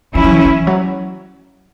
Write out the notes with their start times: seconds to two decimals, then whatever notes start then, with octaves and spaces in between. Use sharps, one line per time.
0.15 E3 C#4 E4
0.24 F#3
0.30 E3
0.45 E3
0.67 F#3